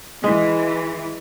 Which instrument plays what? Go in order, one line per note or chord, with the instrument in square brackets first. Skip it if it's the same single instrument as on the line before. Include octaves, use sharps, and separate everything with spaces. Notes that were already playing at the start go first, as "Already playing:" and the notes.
[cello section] E3 [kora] G#3